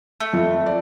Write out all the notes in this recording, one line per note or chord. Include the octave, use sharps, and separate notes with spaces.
A3
F2 F3
D5